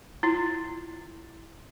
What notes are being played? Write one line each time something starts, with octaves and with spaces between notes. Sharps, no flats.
E4 F4